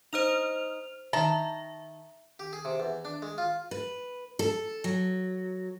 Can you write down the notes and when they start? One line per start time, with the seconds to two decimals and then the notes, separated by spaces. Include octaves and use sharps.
0.13 D#4 C5 D#5 F6 F7
1.13 D#3 E5 A5 A#5
2.39 G4
2.53 G#4
2.65 C3
2.80 E2
3.05 D4
3.22 G#3
3.38 F4
3.71 B4
4.39 A4
4.84 F#3